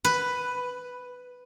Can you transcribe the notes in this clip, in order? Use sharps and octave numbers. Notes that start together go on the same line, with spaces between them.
B4